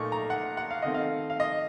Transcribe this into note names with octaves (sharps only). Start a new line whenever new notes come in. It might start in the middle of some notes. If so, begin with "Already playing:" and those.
Already playing: A#2 A3 D#4 C#6
A#5
F#5
F#5
F5
D#3 A3 C4 D#5
F5
F5
D#5